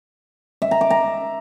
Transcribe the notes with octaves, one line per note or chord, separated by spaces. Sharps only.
E5
A#5
D6
A#5